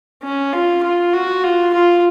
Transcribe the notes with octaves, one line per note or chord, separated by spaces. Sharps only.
C#4
F4
F4
F#4
F4
F4